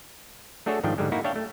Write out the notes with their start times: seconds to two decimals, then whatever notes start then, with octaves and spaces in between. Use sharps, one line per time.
0.66 A3 D4 F#4 G#4 A4 C#5
0.84 G#2 D#3 F3 D4 G5
0.98 G#2 D3 G3 G#3
1.12 A#3 D#4 E4 F#4
1.24 D4 C#5 E5 F5 G5
1.36 A3